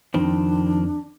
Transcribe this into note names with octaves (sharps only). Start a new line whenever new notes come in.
F2 D#3 C4 D4